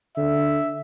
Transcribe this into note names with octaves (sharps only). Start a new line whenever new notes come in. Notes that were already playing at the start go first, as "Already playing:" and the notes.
D3 E5